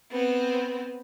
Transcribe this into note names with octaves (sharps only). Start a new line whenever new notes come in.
B3 C4